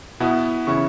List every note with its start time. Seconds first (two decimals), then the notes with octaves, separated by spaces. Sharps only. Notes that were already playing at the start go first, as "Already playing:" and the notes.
0.20 B2 B3 E4
0.67 C#3 E3 C#4 E4 C#6